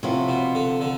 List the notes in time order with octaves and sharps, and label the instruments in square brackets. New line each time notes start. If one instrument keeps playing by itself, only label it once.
[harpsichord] A2 [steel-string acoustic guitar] C3 F3 B3 F4
[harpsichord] B2
D3
D3